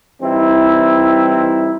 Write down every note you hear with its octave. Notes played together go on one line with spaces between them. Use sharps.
E3 G3 C4 D#4 E4